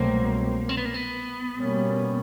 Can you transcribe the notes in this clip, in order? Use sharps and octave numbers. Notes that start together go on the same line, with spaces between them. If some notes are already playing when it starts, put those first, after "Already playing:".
Already playing: C2 B2 F#3 A3 A#3 C4
C4
B3
A#3
B3
B2 G3 A#3 C#4